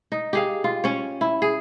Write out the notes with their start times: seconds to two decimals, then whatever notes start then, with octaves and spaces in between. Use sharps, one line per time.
0.12 D#4
0.33 G4 G#4 F5
0.64 F4
0.84 C#4 C#5
1.21 E4
1.42 G#4